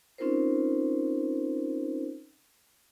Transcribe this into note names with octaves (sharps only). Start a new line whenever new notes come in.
C4 C#4 D#4 F4 A#4 C5